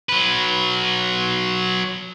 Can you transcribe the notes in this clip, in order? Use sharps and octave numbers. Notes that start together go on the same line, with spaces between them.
F#3 B4